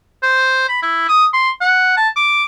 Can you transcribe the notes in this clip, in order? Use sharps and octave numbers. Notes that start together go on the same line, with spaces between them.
C5
B5
E4
D#6
C6
F#5
A5
D6